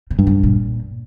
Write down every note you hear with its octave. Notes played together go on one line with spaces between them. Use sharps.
C#3
G2
C#3
A#2